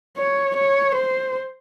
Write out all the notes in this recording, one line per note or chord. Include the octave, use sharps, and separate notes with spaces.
C#5
C#5
C5